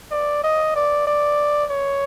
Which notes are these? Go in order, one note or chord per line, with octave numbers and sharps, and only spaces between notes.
D5
D#5
D5
D5
C#5